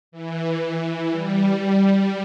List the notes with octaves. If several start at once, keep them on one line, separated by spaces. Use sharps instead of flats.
E3
G3